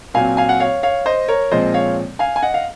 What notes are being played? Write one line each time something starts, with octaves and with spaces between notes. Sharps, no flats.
A#2 F#3 C4 F5 G#5
F5 G#5
F#5
C#5 F5
C#5 F5
C5 D#5
A#4 C#5
A#2 F3 G#3 C4 C5 D#5
C#5 F5
F5 G#5
G#5
D#5 F#5
F5